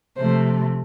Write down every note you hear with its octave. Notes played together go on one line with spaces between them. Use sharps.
C3 F3 A3 C5